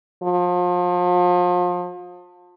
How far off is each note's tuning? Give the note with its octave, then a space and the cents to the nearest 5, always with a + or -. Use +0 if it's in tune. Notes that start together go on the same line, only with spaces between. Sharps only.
F3 +35